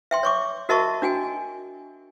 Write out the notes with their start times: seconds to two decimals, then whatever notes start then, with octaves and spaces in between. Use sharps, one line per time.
0.11 E5 G5 C6
0.23 C#5 C#6 D6
0.69 F#4 A#4 D#5 E5 A5 C#6
1.02 D4 F#4 G5 G#5